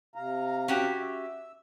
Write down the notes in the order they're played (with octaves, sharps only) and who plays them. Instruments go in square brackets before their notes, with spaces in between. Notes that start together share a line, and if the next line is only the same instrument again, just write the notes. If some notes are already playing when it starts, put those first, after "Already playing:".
[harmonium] C3 F5 A#5
[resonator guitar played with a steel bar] C#4 F#4 G4
[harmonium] E5